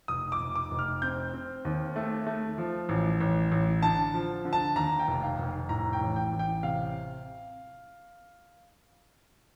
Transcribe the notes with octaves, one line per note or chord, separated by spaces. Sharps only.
F1 D#6
D6
F1
D6
F1
F6
C4 G6
C4
D#2
A3
A3
F3
A1
A1
A1
D3 A5
F3
D3
A5
D#2 A#5
G5
F1
F5
F1
A2 A#5
G5
A1
G5
A1
G5
C3 F5